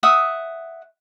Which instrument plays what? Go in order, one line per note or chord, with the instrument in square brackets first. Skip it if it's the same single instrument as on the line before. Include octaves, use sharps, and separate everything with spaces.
[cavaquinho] E5 F#5 D#6